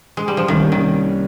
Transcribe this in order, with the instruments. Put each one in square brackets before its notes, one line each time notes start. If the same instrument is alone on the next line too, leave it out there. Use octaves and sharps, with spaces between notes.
[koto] G#3
G3
F3
[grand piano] C2 C3 G3 A#3 C#4 [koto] D#3
[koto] D#3